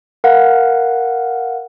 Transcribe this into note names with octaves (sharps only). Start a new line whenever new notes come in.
A#4 F5 F#5